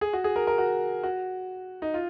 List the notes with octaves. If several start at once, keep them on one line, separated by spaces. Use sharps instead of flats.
G#4
F#4
G#4
A#4
A#4
F#4
F#4
D#4
F4